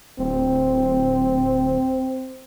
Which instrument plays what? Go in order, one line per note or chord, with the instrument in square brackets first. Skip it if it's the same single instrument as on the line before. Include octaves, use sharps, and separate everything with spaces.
[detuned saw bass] D1 [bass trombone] C4